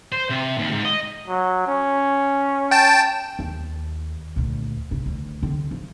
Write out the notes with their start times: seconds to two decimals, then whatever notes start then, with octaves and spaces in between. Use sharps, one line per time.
0.12 C5
0.30 C3
0.58 D#2
0.72 G#2
0.85 D#5
1.28 F#3
1.66 C#4
2.71 G5 A5
3.39 D#2
4.36 D2 A#2
4.91 C#3 G#3
5.06 D2
5.43 D3 C4
5.71 F3